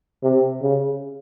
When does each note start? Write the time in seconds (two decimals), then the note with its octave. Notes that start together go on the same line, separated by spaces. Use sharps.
0.23 C3
0.63 C#3